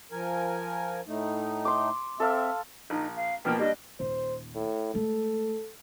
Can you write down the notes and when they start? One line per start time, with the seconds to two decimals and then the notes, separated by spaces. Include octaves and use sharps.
0.12 F3 A#4 G#5
1.08 A2 A3 D#4
1.65 C6 D6
2.20 C4 A4 E5 F5
2.90 A#1 D#4
3.16 F5
3.45 B2 F3 A#3 G5
3.59 G3 D4 D#5
4.00 D#1 C5
4.55 A2
4.94 G#3 A3 A4